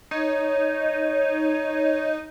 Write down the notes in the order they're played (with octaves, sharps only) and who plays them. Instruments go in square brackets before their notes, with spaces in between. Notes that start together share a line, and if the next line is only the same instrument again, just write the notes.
[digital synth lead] D#4 [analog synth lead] C#5